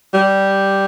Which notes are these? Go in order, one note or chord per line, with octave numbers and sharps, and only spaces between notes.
G3